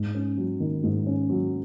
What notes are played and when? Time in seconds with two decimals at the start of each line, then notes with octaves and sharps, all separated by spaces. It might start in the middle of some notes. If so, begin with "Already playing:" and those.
Already playing: G#2
0.15 C#4
0.37 F#3
0.60 D#3
0.84 G#2
1.07 C#4
1.30 F#3